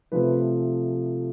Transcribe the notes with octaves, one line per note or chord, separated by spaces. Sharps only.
C3 F3 A3 B4